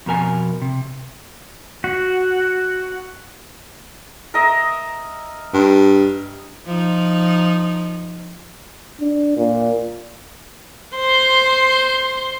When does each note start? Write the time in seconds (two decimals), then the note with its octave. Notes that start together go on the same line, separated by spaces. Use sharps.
0.06 F2 B2 A#4 G#5
0.62 C3
1.84 F#4
4.34 A#4 D#5 E5
5.53 G2
6.66 F3 D#4
9.00 D4
9.37 A#2
10.96 C5 C6